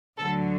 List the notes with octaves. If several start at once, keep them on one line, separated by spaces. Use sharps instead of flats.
D2 D3 F#3 A4